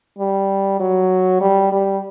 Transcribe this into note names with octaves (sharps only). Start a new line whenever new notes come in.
G3
F#3
G3
G3